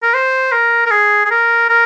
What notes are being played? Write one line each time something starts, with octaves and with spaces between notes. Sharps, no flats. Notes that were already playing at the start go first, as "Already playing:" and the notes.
A#4
C5
A#4
A#4
G#4
G#4
A#4
A#4